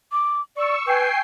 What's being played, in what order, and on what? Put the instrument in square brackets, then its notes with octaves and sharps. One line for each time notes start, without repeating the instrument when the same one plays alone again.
[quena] D6
[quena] D5 [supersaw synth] C#6 E6
[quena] B4 [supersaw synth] G5 G#5 C7